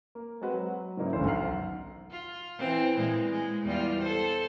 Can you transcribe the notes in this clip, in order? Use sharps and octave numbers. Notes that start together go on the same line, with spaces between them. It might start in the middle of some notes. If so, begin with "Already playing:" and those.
A#3
G#3 C4 F#4 B4
F#3
G#2 C#3 F#3 A#3 D#4 E4
G1 D2 C#3 A3 C5
B1 D#3 F#5 F6 C7
F4
E3 C4
A#2 E3 G#3
G#3
E2 G3 F4
A4 C5